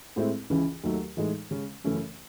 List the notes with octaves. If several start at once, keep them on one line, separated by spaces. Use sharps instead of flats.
A2 G#3 C4 E4
C#2 C#3 E3
D#2 D#3 F#3 A3
A2 E3 G#3 D#4
C#3 G#3 C#4
F#2 C#3 E3 A3 C#4